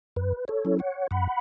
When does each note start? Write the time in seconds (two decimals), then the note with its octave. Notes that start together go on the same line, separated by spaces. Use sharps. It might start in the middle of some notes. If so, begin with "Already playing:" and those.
0.16 F#2 B4
0.48 A4 C#5
0.65 F#3 C#4 E4
0.79 C#5 F#5
1.11 F#2 F#5 B5